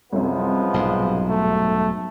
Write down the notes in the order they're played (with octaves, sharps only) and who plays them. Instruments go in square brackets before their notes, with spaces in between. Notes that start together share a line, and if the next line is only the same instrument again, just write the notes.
[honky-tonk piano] C2 F#2 C3 [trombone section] F3 G#3 B3
[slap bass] B1 G#2
[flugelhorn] A3